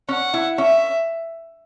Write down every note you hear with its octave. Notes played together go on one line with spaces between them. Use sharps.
C#4 F#5
E4
C#4 E5